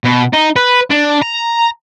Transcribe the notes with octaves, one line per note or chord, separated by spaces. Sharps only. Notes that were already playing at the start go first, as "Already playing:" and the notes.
B2
D#4
B4
D4
A#5